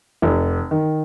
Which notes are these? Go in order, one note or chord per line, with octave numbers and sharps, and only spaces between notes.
F1
D#3